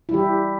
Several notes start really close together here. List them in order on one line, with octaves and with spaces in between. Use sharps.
E4 G3 G4